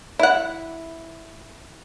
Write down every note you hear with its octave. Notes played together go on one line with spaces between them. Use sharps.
E4 F#5